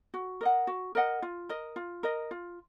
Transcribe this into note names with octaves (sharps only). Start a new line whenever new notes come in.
F#4
A#4 D#5 F#5
F#4
A#4 D#5 F#5
F4
A#4 D#5
F4
A#4 D#5
F4